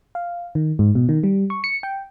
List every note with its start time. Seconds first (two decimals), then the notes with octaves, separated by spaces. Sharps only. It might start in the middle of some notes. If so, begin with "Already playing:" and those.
0.15 F5
0.55 D#3
0.79 G#2
0.95 B2
1.09 D#3
1.23 G3
1.50 C#6
1.64 C#7
1.83 G5